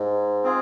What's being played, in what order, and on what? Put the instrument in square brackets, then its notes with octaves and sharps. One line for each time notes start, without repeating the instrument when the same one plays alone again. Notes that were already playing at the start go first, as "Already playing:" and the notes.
Already playing: [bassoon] G#2
[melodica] C4 F4 G#4